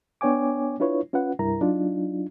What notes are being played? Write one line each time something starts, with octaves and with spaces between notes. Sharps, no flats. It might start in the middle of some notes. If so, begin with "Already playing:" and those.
B3 D4 C#5 G5 G#5 D6
D4 E4 F4 B4 C#5
C#4 F4 B4 F#5
C2 G2 E4 A#4 A#5
F#3 D4 D#4 F4